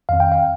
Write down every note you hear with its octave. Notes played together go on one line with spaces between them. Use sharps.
F2 D#3 C4 F5
G5
F5